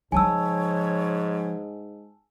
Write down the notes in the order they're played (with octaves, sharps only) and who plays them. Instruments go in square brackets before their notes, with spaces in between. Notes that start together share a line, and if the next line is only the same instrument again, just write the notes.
[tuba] G#2 [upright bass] C#3 F3 [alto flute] C#5 [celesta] G#5 A5 E6